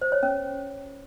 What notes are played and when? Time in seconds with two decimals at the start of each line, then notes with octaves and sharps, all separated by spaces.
0.01 C5
0.12 C#5
0.23 C#4